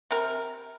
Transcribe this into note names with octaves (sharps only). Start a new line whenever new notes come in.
C3 A#4